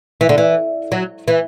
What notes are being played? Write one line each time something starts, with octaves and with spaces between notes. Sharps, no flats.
E3
D3
E3
F#3
E3